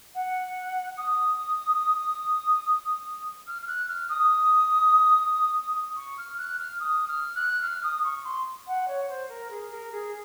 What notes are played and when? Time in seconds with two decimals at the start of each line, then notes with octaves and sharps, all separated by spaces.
0.15 F#5
0.97 D#6
3.47 F6
3.62 F6
3.68 F#6
3.88 F6
4.09 D#6
5.96 C#6
6.18 F6
6.38 F#6
6.59 F6
6.80 D#6
7.08 F6
7.35 F#6
7.63 F6
7.83 D#6
8.04 C#6
8.25 C6
8.67 F#5
8.88 C#5
9.09 C5
9.29 A#4
9.50 G#4
9.71 A#4
9.92 G#4